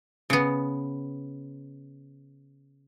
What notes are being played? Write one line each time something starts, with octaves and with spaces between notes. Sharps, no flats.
C#3 B3